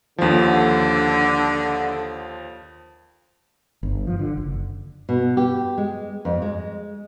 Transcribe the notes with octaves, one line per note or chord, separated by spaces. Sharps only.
D#2 D3 F3
G1
F3
D3
F#1
B2
G4
G#3
F2
G#3